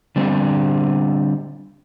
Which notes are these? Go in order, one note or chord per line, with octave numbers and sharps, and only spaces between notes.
D3 G3 C4